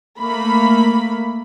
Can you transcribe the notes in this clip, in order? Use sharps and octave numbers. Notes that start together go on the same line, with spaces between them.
A3 A#3 B5